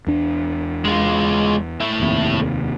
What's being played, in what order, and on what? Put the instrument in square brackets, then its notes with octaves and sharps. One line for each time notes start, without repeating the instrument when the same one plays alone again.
[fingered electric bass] E2 D4
[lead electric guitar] G#3 F4
A3 E4
[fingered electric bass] F1 D#2 C3